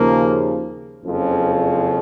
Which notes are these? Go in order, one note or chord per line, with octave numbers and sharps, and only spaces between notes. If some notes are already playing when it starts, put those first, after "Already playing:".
Already playing: D#2 C#3 F3 A#3
F#1 F2 C#3 F3